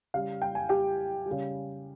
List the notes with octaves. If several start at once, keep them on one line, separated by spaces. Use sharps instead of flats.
C#3 G3 F5
G5
G#5
G4 G5
G3
C#3